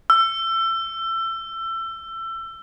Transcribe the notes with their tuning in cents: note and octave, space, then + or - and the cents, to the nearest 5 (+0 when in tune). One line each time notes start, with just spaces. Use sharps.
E6 +25